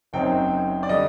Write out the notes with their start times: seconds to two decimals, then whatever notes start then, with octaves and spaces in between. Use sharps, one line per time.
0.13 F#1 F#2 F#3 C4 D#4 G5
0.83 D5
0.89 D3 G3 D#5